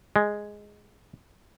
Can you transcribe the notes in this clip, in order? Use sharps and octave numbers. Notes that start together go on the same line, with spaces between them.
G#3